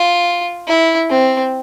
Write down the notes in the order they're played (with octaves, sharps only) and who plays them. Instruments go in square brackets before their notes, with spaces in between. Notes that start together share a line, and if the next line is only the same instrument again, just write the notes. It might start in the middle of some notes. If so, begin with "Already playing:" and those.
Already playing: [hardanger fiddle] F4
E4
C4